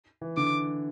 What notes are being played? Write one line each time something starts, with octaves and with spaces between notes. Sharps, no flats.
E3
D3 D6